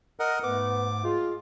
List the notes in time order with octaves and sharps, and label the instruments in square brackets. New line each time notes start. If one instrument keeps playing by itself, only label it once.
[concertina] A#4 D#5 F#5
[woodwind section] G#2 A3 [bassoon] B3 [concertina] D6
[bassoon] G#3 [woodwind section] F4